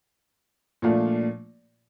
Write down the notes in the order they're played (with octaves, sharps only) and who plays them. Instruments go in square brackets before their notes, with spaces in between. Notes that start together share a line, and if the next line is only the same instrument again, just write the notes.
[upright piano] A#2 F3 A3 D4 F4